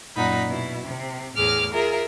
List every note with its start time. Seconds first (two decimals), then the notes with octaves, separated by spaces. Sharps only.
0.16 F#2 A#2 D#4 F#5 B5
0.47 B2 E4
0.86 C3
1.35 E2 A2 G#4 D6 F6
1.74 F4 G#4 A#4 E5